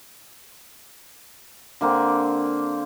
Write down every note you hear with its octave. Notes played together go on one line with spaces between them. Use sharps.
D3 A#3 C4 D5